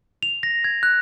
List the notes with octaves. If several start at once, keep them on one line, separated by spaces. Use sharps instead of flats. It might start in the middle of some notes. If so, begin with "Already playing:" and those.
F7
A#6
G#6
F#6